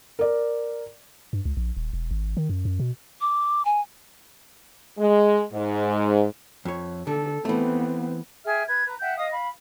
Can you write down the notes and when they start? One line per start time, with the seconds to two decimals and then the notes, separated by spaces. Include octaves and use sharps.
0.19 A#4 D5
1.33 G2
1.45 C#2
1.57 A#1
1.77 D#1
1.93 E1
2.11 G#1
2.37 D#3
2.50 F#2
2.65 F#2
2.80 B2
3.21 D6
3.65 G#5
4.98 G#3
5.53 G#2
6.65 F2 C#5
7.07 D3 A4
7.45 E3 A3 B3 C4
8.45 G#4 E5 G5 F6
8.67 B4 G#6
8.85 B4 A#5
9.01 E5 F#5 G5 G6
9.17 D#5 F5 D#6
9.31 F5 B5